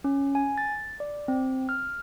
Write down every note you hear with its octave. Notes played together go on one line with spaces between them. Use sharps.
C#4
G#5
A6
D5
C4
F6